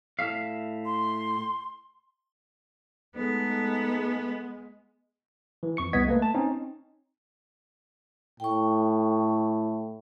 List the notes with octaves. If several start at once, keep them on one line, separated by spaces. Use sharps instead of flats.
A2 E5 F5
C6
G#3 A3 B3 D#4 A4
E3
F2 C#6 C#7
C2 B3 D#5 G#6 B6
A3 A#3 B4
A5
C4 C#4 D#4
A2 G5 C#6